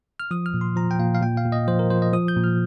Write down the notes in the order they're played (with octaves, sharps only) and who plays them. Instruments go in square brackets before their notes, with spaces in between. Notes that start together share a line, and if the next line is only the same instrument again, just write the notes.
[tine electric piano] F6
F3 D#6
F6
A#2
C6
F3 A#5
G5
A#2 F5
F5
A#2 G5
F5
A#2
D#5
F3 C5
A#4
F3 C5
D#5
F3 D#6
G6
A#2
F6